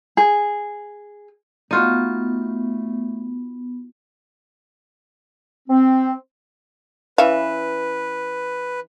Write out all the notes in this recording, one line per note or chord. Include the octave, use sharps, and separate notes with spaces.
G#4
A3 B3 D#4 F4 F#4
C4
E3 C#4 B4 E5 F5